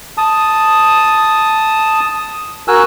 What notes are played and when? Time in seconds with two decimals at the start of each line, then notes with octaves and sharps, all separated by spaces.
0.17 A5 D#6
2.68 F#4 A#4 G#5 E6 F#6